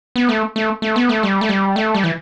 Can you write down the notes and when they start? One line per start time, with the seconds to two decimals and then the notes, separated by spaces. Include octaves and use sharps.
0.16 B3
0.29 A3
0.56 A3
0.82 A3
0.96 B3
1.09 A3
1.23 G3
1.41 A3
1.49 G3
1.76 A3
1.94 G3
2.04 E3